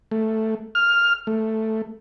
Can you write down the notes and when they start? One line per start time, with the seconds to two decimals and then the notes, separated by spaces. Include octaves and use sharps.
0.11 A3
0.75 F6
1.27 A3